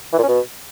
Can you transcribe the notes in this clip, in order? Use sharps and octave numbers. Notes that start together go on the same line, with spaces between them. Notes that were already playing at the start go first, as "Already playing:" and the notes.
E3
A#2
C#4
B2